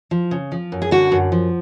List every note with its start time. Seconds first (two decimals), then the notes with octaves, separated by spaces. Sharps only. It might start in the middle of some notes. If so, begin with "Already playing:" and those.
0.11 F3
0.31 C#3
0.52 F3
0.72 F#2
0.82 G#4
0.91 D3 F#4
1.12 F#2
1.32 F3